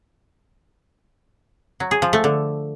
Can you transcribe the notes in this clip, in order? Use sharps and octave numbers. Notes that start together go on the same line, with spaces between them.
F#3
G#4
F3
A3
D3